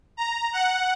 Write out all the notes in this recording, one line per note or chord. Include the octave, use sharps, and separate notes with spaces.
A#5
F#5